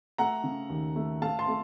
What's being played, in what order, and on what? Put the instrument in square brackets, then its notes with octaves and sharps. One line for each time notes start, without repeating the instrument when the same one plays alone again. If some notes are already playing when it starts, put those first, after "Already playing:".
[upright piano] A3 F#5 A#5
C#3
D#2
A3
A3 F5 A5
A5 C6
A3